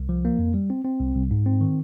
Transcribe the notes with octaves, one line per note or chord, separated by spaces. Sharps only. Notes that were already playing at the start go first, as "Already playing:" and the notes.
Already playing: C2
F3
A#3
F2
G3
C4
C4
C2
C2
G#2
C4
D#3